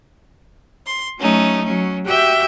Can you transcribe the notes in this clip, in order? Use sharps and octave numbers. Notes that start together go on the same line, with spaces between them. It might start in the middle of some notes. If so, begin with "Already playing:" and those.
C6
F#3 A3 C#4 D#4
F#3 C#4
F#4 G4 E5 G5